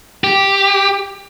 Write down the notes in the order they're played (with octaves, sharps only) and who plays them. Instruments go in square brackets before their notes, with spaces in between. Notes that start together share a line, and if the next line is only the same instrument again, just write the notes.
[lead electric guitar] G4